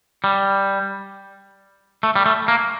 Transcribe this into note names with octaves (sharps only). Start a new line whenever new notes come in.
G3
A3
G3
A3
A#3